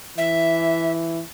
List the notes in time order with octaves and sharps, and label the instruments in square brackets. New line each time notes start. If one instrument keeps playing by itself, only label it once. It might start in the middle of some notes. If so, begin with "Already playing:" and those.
[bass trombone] E3 [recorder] E5